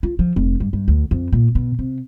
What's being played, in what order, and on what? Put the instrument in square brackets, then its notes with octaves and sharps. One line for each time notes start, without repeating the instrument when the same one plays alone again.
[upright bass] F4
F3
F1
G2
G2
D2
F2
A#2
B2
C3